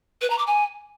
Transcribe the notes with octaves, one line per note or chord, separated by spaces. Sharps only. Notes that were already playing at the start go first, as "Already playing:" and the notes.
B4
A#5
D6
G#5